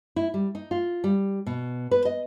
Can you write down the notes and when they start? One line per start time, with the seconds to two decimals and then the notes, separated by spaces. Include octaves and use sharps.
0.16 E4
0.34 G3
0.55 D#4
0.71 F4
1.04 G3
1.46 B2
1.91 B4
2.05 D#5